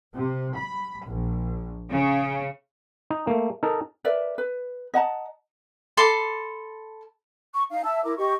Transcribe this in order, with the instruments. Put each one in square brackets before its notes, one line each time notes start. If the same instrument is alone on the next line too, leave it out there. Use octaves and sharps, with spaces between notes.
[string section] C3
B5
A#1
C#3
[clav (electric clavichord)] D#4
A3 A#3
D#4 A4 A#4
[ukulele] A#4 B4 D5 E5
B4
D#5 F#5 A5 A#5
[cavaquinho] A4 B5 C6 D6
[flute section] C#6
D#4 F5
E5 A5 E6
E4 A#4 D6
G4 D#5 C#6